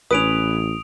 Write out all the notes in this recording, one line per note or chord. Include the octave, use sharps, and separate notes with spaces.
A1 C#4 B4 D#6 D7 F7